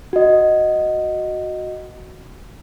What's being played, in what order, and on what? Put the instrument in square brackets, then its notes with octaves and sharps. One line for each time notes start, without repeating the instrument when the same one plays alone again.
[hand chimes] F#4 D#5